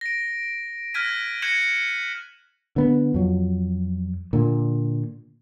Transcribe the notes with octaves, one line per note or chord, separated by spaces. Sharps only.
A#6 D7
F6 F#6 G#6 A#6 B6 D#7
F#6 G#6 A#6 C#7 E7 F#7
D3 B3
F2 F#3
A#2 D3 A#3